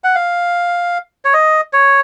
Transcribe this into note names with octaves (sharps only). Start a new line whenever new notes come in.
F#5
F5
C#5
D#5
C#5